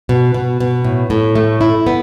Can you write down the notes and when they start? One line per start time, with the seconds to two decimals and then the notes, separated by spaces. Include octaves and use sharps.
0.09 B2
0.34 B2
0.60 B2
0.85 A2
1.10 A2
1.36 A3
1.61 E4
1.87 B3